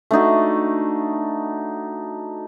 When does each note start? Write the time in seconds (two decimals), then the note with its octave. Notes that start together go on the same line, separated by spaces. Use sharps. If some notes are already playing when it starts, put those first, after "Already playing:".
0.11 A3 D4 D#4 F#4